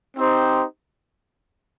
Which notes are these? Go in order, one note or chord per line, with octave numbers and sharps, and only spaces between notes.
C4 D#4 G4 C5